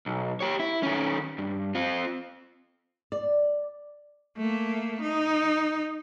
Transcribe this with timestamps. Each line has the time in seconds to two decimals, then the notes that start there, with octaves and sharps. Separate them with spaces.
0.06 B1
0.40 G4 C#5
0.60 E4
0.83 D#3 C#4
1.38 G2
1.75 C4 F4
3.12 D5
4.38 A3 A#3
5.01 D#4